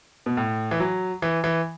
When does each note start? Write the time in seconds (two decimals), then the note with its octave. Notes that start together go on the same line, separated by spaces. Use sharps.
0.26 B2
0.37 A2
0.71 E3
0.80 F#3
1.22 E3
1.44 E3